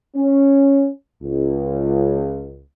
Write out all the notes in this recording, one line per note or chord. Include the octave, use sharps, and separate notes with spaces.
C#4
C#2